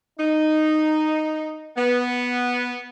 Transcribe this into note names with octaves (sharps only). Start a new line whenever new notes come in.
D#4
B3